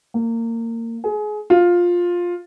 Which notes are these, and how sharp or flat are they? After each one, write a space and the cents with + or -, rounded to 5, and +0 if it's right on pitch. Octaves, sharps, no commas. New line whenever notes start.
A#3 -25
G#4 +25
F4 +10